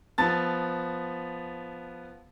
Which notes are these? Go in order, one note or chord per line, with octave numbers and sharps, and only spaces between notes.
F3 B3 A5 A6